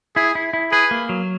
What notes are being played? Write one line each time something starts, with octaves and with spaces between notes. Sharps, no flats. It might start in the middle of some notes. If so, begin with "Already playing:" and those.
E4 G#4
E4
E4
G#4 B4
A#3
F#3